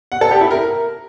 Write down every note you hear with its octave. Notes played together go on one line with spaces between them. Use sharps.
F#5
A4
G4
E4
A#4